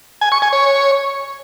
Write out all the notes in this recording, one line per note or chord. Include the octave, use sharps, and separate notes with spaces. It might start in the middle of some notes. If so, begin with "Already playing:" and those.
G#5
C#6
G#5
C#5